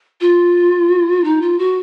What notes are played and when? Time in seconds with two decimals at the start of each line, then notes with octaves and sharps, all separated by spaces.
0.21 F4
1.24 D#4
1.42 F4
1.59 F#4